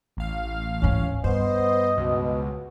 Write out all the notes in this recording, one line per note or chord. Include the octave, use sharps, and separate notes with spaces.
A1 F5
D2 G#2 C#4
G2 B3 C5 D#5
C#2 B2